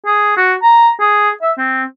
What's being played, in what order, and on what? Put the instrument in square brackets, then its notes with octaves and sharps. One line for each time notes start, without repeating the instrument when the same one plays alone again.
[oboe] G#4
F#4
A#5
G#4
E5
C4